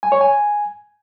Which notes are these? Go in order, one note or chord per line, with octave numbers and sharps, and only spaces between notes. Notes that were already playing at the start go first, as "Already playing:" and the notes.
G#5
C#5
G#5